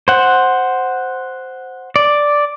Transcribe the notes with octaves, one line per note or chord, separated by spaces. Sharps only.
C5 F#5
D5